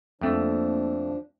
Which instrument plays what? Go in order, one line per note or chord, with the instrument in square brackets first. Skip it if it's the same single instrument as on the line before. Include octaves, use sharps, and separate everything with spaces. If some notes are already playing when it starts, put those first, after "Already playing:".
[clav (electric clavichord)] F2 A3 [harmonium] F3 D4 [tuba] A#3